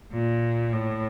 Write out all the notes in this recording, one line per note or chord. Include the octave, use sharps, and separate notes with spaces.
A#2
A2